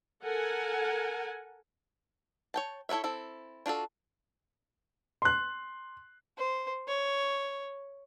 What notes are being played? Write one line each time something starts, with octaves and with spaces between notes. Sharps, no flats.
A4 A#4 F#5 G#5
C#5 G5 A5
E4 A4 B4 C#5 E5
C4 E4 A4
D4 F4 F#4 A4
C6 F#6
C5
C#5